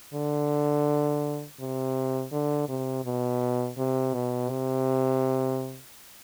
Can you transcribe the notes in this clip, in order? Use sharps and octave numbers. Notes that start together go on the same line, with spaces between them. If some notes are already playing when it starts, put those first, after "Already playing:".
D3
C3
D3
C3
B2
C3
B2
C3